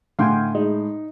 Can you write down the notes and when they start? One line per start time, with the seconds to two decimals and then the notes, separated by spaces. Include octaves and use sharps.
0.19 A2 D3 F5 G5 G#5 C6
0.55 G#3 D#4